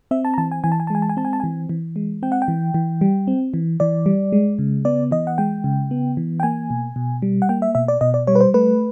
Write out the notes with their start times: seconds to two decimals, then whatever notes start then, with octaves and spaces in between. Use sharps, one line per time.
0.11 C4 E5
0.25 A5
0.34 A#5
0.38 E3 A5
0.52 G#5
0.64 E3 G#5
0.72 A5
0.80 G#5
0.87 A5
0.90 G#3 G#5
1.02 A5
1.09 G#5
1.17 C4 A5
1.25 G#5
1.33 A5
1.40 E3 G#5
1.69 E3
1.96 G#3
2.23 C4 G5
2.32 F#5
2.42 G5
2.48 E3
2.74 E3
3.01 G3
3.27 C4
3.54 E3
3.80 E3 D5
4.06 G3
4.33 G#3
4.59 C#3
4.85 B3 D5
5.11 E3 D#5
5.27 F#5
5.38 G#3 G5
5.64 C#3
5.91 B3
6.17 E3
6.40 G5
6.43 A#3 G#5
6.70 B2
6.96 B2
7.22 G3
7.42 F#5
7.49 A#3 G5
7.62 E5
7.75 B2 E5
7.88 D5
8.01 B2 D#5
8.14 D5
8.27 G3 C#5
8.35 B4
8.41 C5
8.54 A3 B4